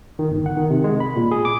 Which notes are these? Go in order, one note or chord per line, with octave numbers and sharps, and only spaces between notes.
D#3
G1
F#5
D#3
C3
G#3
B5
A#2
G#4
D6